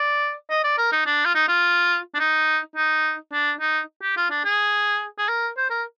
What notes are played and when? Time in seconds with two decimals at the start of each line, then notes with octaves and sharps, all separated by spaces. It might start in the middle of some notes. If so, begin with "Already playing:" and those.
Already playing: D5
0.50 D#5
0.64 D5
0.78 A#4
0.92 D#4
1.06 D4
1.25 F4
1.35 D#4
1.48 F4
2.14 D4
2.19 D#4
2.76 D#4
3.32 D4
3.60 D#4
4.02 G4
4.17 F4
4.30 D4
4.45 G#4
5.18 G#4
5.29 A#4
5.57 C5
5.70 A#4